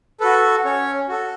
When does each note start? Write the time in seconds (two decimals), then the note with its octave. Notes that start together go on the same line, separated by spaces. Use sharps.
0.20 F#4 A4 B4
0.65 C#4 C#5
1.08 F#4 A4